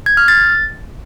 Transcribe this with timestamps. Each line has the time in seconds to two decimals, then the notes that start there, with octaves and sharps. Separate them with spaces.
0.06 G#6
0.17 F6
0.28 A6